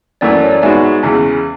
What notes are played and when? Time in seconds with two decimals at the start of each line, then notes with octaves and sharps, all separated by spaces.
0.21 F#2 E3 A3 D5
0.32 D5
0.42 C#5
0.51 D5
0.62 G#2 G#3 B3 F#4 E5 G#5
1.03 E2 C#3 E3